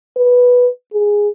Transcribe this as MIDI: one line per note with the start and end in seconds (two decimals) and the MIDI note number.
0.17 0.69 71
0.93 1.29 68